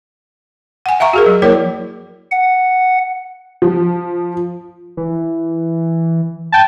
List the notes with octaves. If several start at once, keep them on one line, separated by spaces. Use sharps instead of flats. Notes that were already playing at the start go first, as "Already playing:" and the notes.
F#5 G#5
E5 F5 A#5 C#6
F#4 G#4 A#4
F#3
F3 A#3 E4 A#4 C#5 D5
F#5
F3
E3
G5 A5